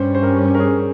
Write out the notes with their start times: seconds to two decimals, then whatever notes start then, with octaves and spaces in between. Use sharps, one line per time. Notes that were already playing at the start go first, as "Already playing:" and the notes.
Already playing: G2 G3 C#4 C5
0.15 C5
0.23 A#4
0.54 A#4
0.60 G#4